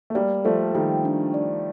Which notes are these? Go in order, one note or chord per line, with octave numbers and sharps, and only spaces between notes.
A3
G3 A#3 D5
F3 A3 A4
D#3 G3 G5
D4
D5